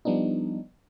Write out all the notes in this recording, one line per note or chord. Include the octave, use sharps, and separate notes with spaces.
F3 G3 B3 D4 D#4